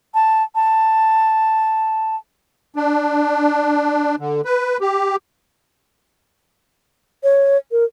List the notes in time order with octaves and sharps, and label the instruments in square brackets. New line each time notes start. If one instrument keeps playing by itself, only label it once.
[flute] A5
A5
[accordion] D4
D3
B4
G4
[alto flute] C#5
A#4